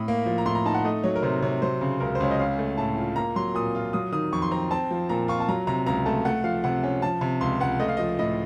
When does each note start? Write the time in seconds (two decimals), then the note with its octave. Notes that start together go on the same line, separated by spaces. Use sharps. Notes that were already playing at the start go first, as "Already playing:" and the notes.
Already playing: A2 D#6
0.08 A#3
0.26 F3
0.38 A#5
0.46 A2 C6
0.55 A#5
0.65 D#4 A5
0.74 F#5
0.85 A3 D#5
1.04 F#3 C#5
1.15 A#4
1.23 C3 C5
1.42 C3 C#5
1.62 F#3 C5
1.81 C#3
2.00 C#2 A#4
2.15 C5
2.20 C#2 C#5
2.31 D#5
2.39 C#4 F5
2.58 A3
2.78 A2 A5
2.97 F4
3.16 A#3 A#5
3.36 F#3 C6
3.54 A#2 D#6
3.75 F4
3.93 F#3 D#6
4.12 D#3 D#6
4.32 F2 C#6
4.42 C6
4.51 C4 A#5
4.71 C4 A5
4.91 F3
5.09 A#2 A#5
5.28 F4 C#6
5.40 A5
5.49 F#3 A#5
5.67 C3 A#5
5.86 C#2 A#5
6.06 A3 A5
6.25 A3 F#5
6.44 F3 F5
6.64 C3 F#5
6.83 C#4
7.02 F3 A5
7.21 C3
7.41 C#2 C6
7.60 C#2 F#5
7.80 A3 D#5
7.88 F5
7.97 F3 D#5
8.19 A2 D#5